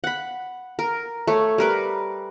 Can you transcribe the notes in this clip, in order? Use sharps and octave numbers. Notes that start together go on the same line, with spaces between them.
F#5 B5
A#4
A3 C#5
G3 A#4 B4